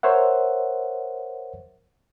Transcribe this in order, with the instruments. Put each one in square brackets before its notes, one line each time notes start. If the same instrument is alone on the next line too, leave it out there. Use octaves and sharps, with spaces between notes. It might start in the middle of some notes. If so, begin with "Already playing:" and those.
[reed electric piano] A#4 C5 C#5 E5 F#5